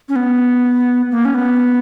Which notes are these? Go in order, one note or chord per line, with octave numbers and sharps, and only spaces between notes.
C#4
B3
A#3
C#4
B3